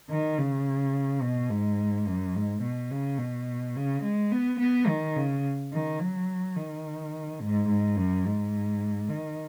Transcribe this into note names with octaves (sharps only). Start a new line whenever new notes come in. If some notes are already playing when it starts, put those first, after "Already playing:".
D#3
C#3
B2
G#2
F#2
G#2
B2
C#3
B2
C#3
G#3
B3
B3
D#3
C#3
D#3
F#3
D#3
G#2
G#2
F#2
G#2
D#3